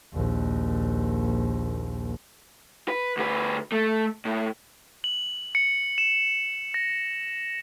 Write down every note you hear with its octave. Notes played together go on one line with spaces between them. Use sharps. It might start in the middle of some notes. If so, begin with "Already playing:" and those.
A#1 D#2
B4
D2 B4
A3
A2
F#7
C#7
E7
A#6